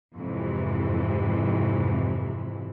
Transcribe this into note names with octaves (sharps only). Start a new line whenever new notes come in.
F2 G#2 C3 E3